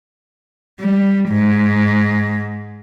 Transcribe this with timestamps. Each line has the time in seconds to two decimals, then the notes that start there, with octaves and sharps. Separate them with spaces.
0.80 G3
1.29 G#2